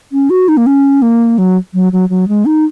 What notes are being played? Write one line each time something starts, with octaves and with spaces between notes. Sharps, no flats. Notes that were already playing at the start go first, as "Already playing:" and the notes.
C#4
F#4
D#4
A#3
C#4
A#3
F#3
F#3
F#3
F#3
G#3
D#4